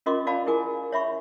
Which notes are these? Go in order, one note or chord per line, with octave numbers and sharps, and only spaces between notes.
C#4 F4 A#4 D#5 C6 D6
C#4 D5 F5 A5 B5
E4 G#4 A#4 G#5 D6
C#5 E5 B5 C#6